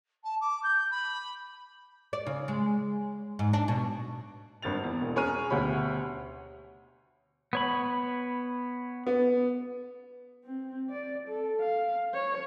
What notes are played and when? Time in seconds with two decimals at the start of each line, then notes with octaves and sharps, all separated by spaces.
0.24 A5
0.41 D6
0.63 G6
0.91 B5
2.13 D5
2.27 C#3
2.48 G#3
3.39 G#2
3.53 D4
3.68 B2
4.62 G#1 G2 A6 F7
4.83 E2
5.01 E1
5.16 C#4 G#4 C#5 A#5 F6 D#7
5.50 D2 B2 G4 C#5 B5
7.53 B3 C#5 B5
9.07 B3
10.45 C4
10.90 D5
11.28 A4
11.61 F5
12.13 C#5